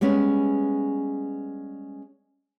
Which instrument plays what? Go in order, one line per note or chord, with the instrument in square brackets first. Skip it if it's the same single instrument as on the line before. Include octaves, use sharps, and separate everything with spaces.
[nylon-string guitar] G3 G#3 B3 C#4